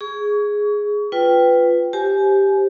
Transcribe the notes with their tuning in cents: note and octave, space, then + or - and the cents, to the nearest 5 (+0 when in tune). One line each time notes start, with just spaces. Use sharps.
G#4 +0 C#6 +30
F4 +0 B4 +10 G5 +0
G4 +0 C5 +15 G#5 +25